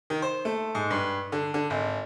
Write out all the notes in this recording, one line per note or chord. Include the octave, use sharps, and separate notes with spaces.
D#3
C5
A3
G#2
G2
D3
D3
G#1